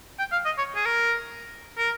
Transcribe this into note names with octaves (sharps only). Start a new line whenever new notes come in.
G5
F5
D#5
C#5
G#4
A#4
A#4